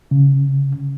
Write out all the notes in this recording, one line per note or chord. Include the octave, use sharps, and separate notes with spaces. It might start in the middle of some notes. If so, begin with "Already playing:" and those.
C#3